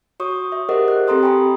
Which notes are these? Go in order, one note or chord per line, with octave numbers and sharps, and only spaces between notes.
F#4 C#5 C#6 D#6
E5
G4 G#4 A#4 C5 D#5 F#5
F#6
C4 G4 A4 A#5 C6 D#6
G5 G#5 A#5 B5